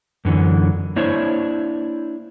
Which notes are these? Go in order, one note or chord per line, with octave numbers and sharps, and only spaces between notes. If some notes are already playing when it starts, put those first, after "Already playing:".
F#2 D3 E3
A#3 D4 E4 C5 C#5 E5